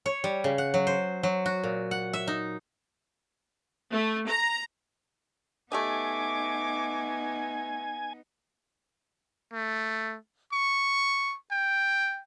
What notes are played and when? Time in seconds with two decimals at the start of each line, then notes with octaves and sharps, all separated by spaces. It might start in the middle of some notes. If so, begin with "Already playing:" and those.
0.06 C#5
0.24 G3
0.44 C#3
0.58 F#5
0.74 F#3
0.87 C5
1.23 F#3
1.46 F#4
1.63 A#2
1.91 F#5
2.13 E5
2.27 D#4
3.90 A3
4.27 A#5
5.72 A3 B3 D#4 G4 D#5 G#5 D6
9.53 A3
10.53 C#6
11.51 G5